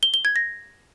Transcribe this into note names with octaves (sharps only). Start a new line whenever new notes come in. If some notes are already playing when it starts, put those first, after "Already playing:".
G7
G7
G#6
A#6